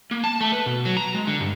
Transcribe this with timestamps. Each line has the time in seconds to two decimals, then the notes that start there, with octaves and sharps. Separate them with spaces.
0.11 A#3
0.24 A5
0.41 A3
0.52 B4
0.66 B2
0.85 F#3
0.97 A#5
1.15 G#3
1.27 D3
1.40 G2